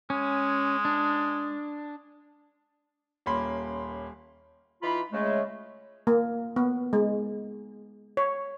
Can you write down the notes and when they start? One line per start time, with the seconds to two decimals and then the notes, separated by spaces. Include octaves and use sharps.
0.10 G#3 C#4
0.85 D4
3.26 D#1 A#3 C#4 B5 C6
4.82 E3 D#4 F4 B5
5.12 C#3 G#3 A3
6.07 A#3
6.56 B3
6.93 G#3
8.17 C#5